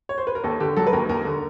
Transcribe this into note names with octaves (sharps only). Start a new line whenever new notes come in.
C#5
C5
B4
A#4
D#2 A4
D3 G4
F#3 A4
B4
D#2 A#4
D#2 A#4
D3